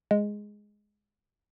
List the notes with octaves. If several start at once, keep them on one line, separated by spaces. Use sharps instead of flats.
G#3